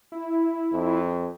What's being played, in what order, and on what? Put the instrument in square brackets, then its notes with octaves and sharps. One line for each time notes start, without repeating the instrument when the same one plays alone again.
[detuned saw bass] E4
[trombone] F2